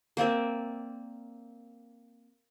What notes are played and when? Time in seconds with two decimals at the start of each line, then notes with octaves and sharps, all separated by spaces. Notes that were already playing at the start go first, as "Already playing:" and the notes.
0.17 A#3 C4 D5 E5